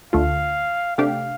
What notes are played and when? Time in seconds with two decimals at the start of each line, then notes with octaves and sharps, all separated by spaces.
0.13 D2 D3 A3 F4 F5
0.97 C3 A3 D4 G4 F5